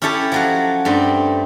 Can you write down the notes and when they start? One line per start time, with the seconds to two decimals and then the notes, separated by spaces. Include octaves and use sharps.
0.02 C#4 E4 G4 A4 C#5 A5
0.32 F3 F#3 F#4
0.85 G2 A3 C4